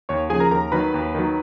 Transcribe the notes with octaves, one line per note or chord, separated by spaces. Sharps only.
D#2 C#5 C#6
C#3 F3 G#4 G#5
A#4 A#5
D#2 A#4 A#5
D#3 F#3 B4 B5
D#2
D#3 F#3